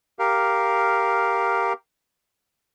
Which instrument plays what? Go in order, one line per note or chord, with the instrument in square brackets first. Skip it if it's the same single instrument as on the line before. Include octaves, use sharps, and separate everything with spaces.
[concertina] G4 A#4 F5